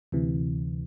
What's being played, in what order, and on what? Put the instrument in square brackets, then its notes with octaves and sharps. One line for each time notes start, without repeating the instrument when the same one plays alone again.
[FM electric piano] D2 C3 E3